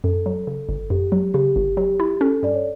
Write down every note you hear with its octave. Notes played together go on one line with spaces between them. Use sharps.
F#2 A4
F#3
C#3
G1
F#2 G4
F#3
C#3 G4
G1
F#3 G4
E4
C#4 A4
G2 D5
C#5